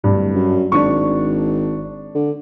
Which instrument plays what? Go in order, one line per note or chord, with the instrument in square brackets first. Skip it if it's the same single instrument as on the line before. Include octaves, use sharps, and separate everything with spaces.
[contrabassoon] D1 [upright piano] G2
[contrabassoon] F#2
[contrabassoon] G#1 [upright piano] D4 C#6
[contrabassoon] D3